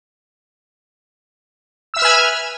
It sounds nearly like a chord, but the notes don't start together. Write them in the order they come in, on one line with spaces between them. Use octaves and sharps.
E6 E5 F6 B4 G#5